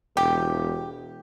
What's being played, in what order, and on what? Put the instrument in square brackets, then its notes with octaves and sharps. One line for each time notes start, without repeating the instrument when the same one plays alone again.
[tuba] E1 [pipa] G4